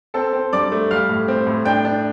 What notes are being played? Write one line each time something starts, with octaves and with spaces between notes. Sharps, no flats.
C4 A4 A5
C4
G2 D5 D6
A3
G3 F5 F6
A2
C4
A2
D4 G5 G6
D4